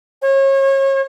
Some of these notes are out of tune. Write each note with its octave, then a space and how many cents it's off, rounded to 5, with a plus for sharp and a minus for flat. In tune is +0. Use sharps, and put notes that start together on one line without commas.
C#5 -35